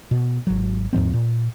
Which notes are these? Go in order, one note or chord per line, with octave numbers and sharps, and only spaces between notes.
B2
G#1 F#3
D#2 G#2 F3 C4
A#2